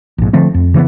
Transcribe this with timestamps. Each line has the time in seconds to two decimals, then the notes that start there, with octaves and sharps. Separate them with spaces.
0.18 A#1 G#2
0.33 D3 F3 A3 C4
0.54 F2
0.74 C#3 E3 A#3 B3